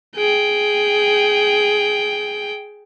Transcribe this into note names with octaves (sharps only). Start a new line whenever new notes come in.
G#4 G5